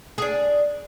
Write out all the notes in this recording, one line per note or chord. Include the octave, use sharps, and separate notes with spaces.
D4 G#4